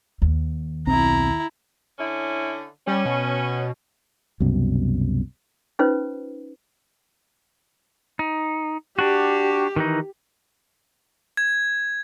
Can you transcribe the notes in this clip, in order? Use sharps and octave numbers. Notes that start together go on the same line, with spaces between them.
D#2
B1 C4 E4 A#5
D3 C#4 E4
G3 C#4
B2
C2 F#2 B2
C#4 D#4 F4 B4 C5
D#4
D4 F#4 G4
D#3 E3 D#4
G#6